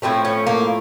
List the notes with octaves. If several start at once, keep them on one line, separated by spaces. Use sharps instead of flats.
A2 F3 A3 C4
C#4
A#3